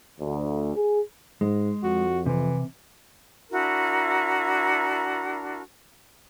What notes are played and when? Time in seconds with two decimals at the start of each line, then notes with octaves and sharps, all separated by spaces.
0.20 D2
0.76 G#4
1.41 G#2 G#3
1.83 F2 F#4
2.26 C3 E3
3.50 D4 E4 F#4 A#4